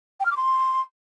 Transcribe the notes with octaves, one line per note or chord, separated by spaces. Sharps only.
G5
F6
D6
C6